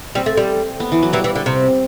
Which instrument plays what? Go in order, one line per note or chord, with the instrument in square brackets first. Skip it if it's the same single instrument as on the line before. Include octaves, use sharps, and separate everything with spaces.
[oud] G3 [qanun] C4
[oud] A3
G3
[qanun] B3
E3
F#3
[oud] E3 [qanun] G3
[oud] E3
D3
C3